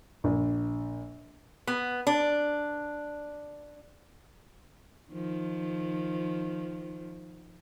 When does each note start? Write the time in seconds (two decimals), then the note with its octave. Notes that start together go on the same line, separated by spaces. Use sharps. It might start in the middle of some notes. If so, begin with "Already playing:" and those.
0.24 A#1
1.67 B3
2.07 D4
5.12 D#3 F3